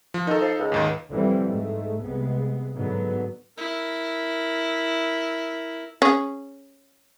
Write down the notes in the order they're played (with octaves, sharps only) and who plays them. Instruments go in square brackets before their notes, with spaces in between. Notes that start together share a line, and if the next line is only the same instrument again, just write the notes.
[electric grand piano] F3
[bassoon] D#3 [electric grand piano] D#4 A4
[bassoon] F3
C#2
[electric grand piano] D#2 G#2 D#3
[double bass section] D3 E3 F3 G3 C4
G#2 G#3 A3
C2 C3 G#3 B3
G#2 D3 F#3 B3
[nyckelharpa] E4 A#4
[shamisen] C#4 G#4